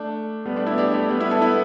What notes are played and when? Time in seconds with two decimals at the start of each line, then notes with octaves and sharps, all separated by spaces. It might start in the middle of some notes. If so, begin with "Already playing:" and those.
Already playing: A3 D4
0.46 G3 B3
0.56 A3 D4
0.66 B3 E4
0.78 D4 G4
0.93 A3 D4
1.09 G3 B3
1.20 B3 E4
1.31 E4 A4
1.41 B3 E4